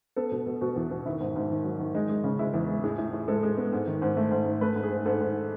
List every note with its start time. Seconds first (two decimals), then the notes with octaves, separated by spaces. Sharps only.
0.16 B3 A4
0.32 B2
0.47 B2
0.61 B2 F#4
0.76 E2
0.91 B2
1.06 D#3 E4
1.21 G#2
1.36 G#2
1.50 D#3
1.65 F#3
1.80 D#3
1.94 G#3 D#4
2.09 G#3
2.24 C#3
2.39 G#3 E4
2.54 E2
2.69 G#3
2.84 A2 G#4
2.98 A2
3.13 A2
3.28 G#3 A4
3.43 G#3
3.57 B3
3.72 G#2
3.87 D#3
4.02 G#2
4.17 A3
4.31 G#2
4.46 G#2
4.61 A3 B4
4.76 G#2
4.83 G#4
4.91 G#2
5.06 G#2 A4
5.20 G#2